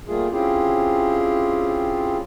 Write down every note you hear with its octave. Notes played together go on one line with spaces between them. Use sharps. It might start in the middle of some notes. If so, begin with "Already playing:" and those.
G3 A3 A#3 F4 G#4
C4 C#4 E4 F4 G4 G#4